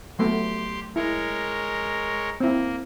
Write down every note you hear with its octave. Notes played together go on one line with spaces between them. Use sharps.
F#3 A3 B3 G4 C6
G#3 E4 A#4 C#5
A#3 C4 E4